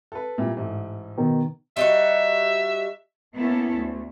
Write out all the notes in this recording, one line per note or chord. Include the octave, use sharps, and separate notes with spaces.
A4 B4
A#2 G3 E4
A1 G#2 A3
B2 D#3
G3 D#4 F#4 E5
A#3 B3 C#4 E4 A4
D2